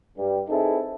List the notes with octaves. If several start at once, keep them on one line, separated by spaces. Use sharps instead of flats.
G2 G3 G4
C4 D#4 E4 G#4 A4 B4